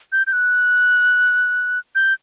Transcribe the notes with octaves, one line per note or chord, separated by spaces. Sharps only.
G6
G6
F#6
G6